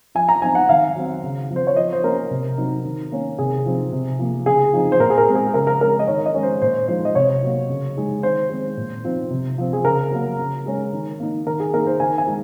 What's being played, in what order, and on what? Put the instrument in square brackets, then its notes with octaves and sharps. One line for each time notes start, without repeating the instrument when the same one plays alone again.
[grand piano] F3 G#5
A#5
C4 D#4 G#5
F#5
D#3 F5
F#3 C4
C#3
F3 C4
C5
C#5
F3 D#5
C5
A#3 C#4 A#4
C3
F#3 C4 D#4
D#3
A#3 C#4
C3 G#4
F3 C4 D#4
C3
F3 A#3
C#3 G#4
F3 C4 D#4
C5
A#2 A#4
G#4
A#4
G#3 C4
G#4
C#3 A#4
A#4
G#3 C#4 A#4
D#5
D#3 C#5
D#5
G#3 C#4
C5
A#2 C5
F3 G#3 D#4 C5
D#5
C3 C#5
F#3 A#3
C#3
G#3 D#4
D#3 C5
G#3 C4
A#2
F3 C4 D#4
C3
F3 C4
G#4
C#3 A#4
F#3 A#3
C#3
G#3 C#4
D#3
A#3 D#4
D#3 A#4
G#4
A#3 D#4 A#4
C5
D#3 G#5
G#5
G#3 D#4